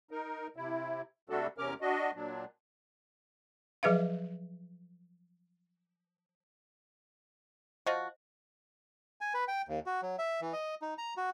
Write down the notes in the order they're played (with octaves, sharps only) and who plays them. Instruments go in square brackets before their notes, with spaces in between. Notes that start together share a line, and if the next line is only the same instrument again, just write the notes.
[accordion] D#4 A#4
C3 E4
C3 G3 A3 D4 F#4 A4
E2 C3 C#4 A#4 D6 F6
D4 F#4 D#5
A#2 F#3 D4
[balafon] F3 F#3 G#4 B4 E5 F5
[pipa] F3 F#4 [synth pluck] C5 D#5
[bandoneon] G#5
B4
G5
D#2
F#4
F#3
E5
E3
D#5
D#4
A#5
F#4